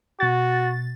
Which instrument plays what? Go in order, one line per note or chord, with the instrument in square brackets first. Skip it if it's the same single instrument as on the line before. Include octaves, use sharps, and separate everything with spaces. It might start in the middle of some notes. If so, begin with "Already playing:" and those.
[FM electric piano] B2 A6 [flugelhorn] F#4